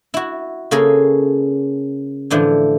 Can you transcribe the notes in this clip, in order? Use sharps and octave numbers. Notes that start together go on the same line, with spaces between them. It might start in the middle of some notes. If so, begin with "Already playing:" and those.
E4 F#4
C#3 A#3 C#4 G#4 A4 A#5
A2 D3 E3 F3